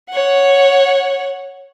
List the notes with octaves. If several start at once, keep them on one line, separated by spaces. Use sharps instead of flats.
C#5 F#5